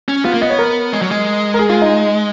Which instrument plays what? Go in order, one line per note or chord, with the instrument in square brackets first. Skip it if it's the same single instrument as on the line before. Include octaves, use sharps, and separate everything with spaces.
[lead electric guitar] C#4
[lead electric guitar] B3 [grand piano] F4
[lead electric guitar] A#3
[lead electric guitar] B3 [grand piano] D#5
[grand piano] C#5
A#4
[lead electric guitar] G#3
F#3
G#3
[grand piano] A#4
G#4
F4
D#4